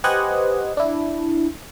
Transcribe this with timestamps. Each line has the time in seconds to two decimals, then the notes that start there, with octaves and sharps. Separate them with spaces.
0.04 G4 B4 C5 D#5 F#5 G#5
0.77 D4 E4